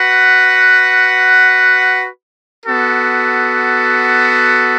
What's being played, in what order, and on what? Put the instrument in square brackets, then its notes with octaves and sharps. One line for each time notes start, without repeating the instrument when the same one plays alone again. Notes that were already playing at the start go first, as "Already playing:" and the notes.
Already playing: [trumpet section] F#4 B4 F#5
B3 F#4 A4